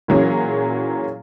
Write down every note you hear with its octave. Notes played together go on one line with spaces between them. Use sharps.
A#2 E3 F#3 C#4 G#4